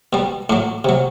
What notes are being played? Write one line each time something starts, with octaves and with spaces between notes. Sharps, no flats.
B2 G3
A2 F#3 D4
C3 F#3